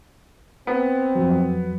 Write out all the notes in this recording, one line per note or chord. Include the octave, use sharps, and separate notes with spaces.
B3 C4
F2 F#3